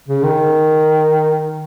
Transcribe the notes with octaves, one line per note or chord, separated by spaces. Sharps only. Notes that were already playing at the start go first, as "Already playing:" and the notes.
C#3
D#3